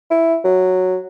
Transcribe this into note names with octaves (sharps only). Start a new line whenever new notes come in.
E4
F#3